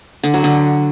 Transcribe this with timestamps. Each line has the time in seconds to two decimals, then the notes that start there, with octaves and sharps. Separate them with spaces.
0.23 D3
0.34 F#3
0.44 D3